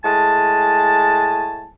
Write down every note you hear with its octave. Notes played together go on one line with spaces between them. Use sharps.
A2 G#3 G#5 A5